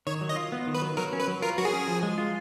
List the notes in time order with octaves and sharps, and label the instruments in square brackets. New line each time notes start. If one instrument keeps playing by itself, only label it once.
[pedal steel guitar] D#3 [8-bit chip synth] C#5
[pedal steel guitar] F#3
[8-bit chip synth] D#5
[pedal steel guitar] F4
B3
D#3
[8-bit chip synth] B4
[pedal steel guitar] F#3
[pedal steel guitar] F#3 [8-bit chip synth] A#4
[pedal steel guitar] C#4
[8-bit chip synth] B4
[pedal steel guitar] F#3
[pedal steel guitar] F4 [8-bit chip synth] A#4
[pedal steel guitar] F#3 [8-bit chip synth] F#4
[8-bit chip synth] G#4
[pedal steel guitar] C#4
F3
G#3
F4